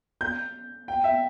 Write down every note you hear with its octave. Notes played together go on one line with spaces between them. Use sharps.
G6
G5
E5